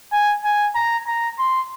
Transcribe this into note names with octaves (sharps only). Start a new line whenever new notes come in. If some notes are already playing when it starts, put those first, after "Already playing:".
G#5
G#5
A#5
A#5
C6